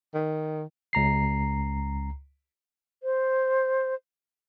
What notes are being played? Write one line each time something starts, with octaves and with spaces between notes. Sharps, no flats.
D#3
C#2 A#5 C7
C5